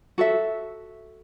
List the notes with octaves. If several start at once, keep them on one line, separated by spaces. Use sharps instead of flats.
F#4 A4 E5